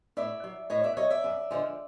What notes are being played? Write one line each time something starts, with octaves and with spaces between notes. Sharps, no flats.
A2 D5 E5
F#3
A2 C#5 D#5
D5 E5
F#3 C#5 D#5
D5 E5
F#2
D3 F3 G#3